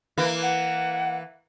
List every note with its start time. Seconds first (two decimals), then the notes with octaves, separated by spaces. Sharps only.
0.18 E3 A#3
0.42 F#5